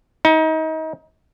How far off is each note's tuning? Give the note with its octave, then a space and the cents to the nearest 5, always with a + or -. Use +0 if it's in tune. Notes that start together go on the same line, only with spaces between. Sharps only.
D#4 +30